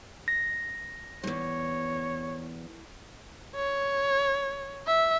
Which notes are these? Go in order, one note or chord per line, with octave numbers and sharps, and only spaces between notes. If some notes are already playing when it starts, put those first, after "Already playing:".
A#6
E2 G2 C#5
C#5
E5